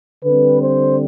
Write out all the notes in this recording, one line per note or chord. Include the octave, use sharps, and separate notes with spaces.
D3 G3 C4 B4
C5